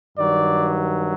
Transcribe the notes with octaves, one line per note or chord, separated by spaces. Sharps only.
G2 D#3 F#3 D5